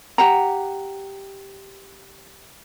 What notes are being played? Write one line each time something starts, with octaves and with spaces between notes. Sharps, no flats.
G4 F#5 A#5